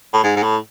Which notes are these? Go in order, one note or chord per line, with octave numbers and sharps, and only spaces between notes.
A2
G#2
G#2
A2